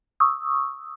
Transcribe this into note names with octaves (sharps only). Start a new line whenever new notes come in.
C#6 D#6 E6